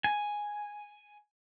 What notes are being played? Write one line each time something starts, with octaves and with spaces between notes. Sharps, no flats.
G#5